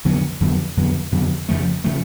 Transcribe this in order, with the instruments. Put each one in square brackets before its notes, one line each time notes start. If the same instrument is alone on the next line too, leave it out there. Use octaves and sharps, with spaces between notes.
[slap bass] F2 D3 F#3 B3
F2 D3 F#3 B3
F2 D3 F#3 B3
F2 D3 F#3 B3
F2 C#3 F3 A3
C#3 F3 A3